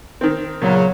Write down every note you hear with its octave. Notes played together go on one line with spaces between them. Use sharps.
D#3 C4
E2 A#2 C#3 F#3